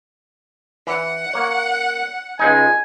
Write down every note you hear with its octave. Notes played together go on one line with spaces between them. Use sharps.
E3 F#5
A#3 C#5
C#2 G#3 D#4 G#5